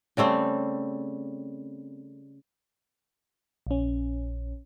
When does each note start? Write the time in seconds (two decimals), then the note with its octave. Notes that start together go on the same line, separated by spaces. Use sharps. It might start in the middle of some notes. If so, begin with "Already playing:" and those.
0.17 C#3 G3 A3 C4
3.67 A#1 C#4